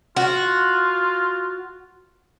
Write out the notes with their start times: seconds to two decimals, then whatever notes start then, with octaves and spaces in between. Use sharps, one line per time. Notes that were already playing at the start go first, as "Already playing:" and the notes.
0.16 F4 F#4